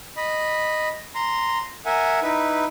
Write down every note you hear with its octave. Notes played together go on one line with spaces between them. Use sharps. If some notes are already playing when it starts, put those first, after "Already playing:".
D#5 B5
A#5 C6
A#4 E5 F#5 G#5
D#4 E4 B4